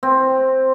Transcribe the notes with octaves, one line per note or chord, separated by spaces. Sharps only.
C4